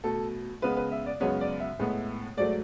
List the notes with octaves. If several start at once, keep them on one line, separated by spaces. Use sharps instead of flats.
B2 A3 A4
C#3 G#3 B3 B4
B4
E5
D5
F#2 C#3 G#3 B3 C#5
D5
E5
A2 G#3 B3
G#2 F#3 A3 D5